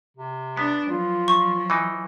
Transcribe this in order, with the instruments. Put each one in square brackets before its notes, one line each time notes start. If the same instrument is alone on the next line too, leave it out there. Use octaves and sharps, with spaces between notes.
[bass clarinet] C3
[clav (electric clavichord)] B3 [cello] D4
[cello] F3 F#3 [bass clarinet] F4
[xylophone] C#6
[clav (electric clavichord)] E3 D#4